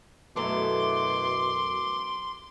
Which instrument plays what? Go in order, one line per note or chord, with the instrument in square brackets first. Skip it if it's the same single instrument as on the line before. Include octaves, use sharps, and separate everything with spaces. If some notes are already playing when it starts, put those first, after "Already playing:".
[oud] F#2 E3 A3 [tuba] B2 [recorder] C6 [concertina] D6